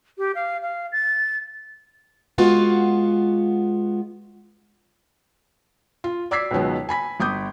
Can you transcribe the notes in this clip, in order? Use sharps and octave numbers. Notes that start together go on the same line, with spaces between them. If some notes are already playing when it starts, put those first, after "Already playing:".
G4
F5
F5
A6
G#3 B3 F4 F#4 F5
F4
D5 D6 E6 G#6 B6 C7
C#2 B2 D#3 F#3 B3
G#5 B5 B6
G1 D6 D#6 G6